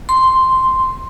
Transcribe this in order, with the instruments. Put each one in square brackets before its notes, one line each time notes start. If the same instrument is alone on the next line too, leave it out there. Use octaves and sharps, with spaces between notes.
[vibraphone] C6